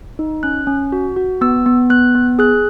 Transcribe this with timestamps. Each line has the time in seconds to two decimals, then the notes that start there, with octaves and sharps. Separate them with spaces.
0.19 D#4
0.43 C#4 F#6
0.67 C#4
0.92 F#4
1.16 F#4
1.41 B3 E6
1.66 B3
1.90 B3 F#6
2.15 B3
2.39 G#4 F#6